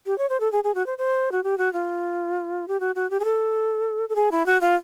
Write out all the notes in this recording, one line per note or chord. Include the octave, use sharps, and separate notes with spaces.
G4
C#5
C5
A4
G#4
G#4
F#4
C5
C5
F#4
G4
F#4
F4
G4
F#4
F#4
G4
G#4
A4
A4
G#4
E4
F#4
F4